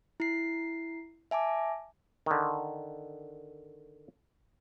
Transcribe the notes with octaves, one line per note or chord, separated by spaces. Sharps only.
E4 C7
E5 G#5 A5 D6
D3 D#3